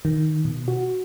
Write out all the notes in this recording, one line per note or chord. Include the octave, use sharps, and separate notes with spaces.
D#3
B2
F#4